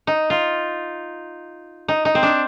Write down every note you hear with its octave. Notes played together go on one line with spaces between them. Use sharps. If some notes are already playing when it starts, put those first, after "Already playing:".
D#4
F4
D#4
D#4
C4
D4